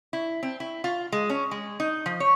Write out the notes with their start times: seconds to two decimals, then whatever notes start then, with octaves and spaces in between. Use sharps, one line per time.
0.13 E4
0.43 C4
0.60 E4
0.84 F4
1.12 G#3
1.30 C#4
1.51 G#3
1.80 D#4
2.06 F3
2.20 C#5